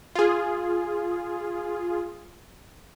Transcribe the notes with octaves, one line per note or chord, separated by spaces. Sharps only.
F4 G#4